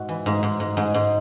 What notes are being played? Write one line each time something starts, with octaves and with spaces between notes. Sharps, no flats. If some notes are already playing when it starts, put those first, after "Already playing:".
Already playing: G#2 F#4
E3
G#2
G#2
G#2
G#2
G#2